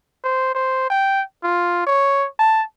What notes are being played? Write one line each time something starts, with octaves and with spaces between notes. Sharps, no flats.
C5
C5
G5
F4
C#5
A5